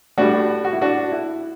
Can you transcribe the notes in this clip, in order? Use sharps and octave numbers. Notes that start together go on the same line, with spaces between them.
A2 G3 D4 F#4
F#4
E4
D4 F#4
E4